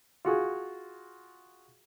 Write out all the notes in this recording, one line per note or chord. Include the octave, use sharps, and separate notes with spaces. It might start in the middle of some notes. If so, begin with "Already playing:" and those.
F4 F#4 G#4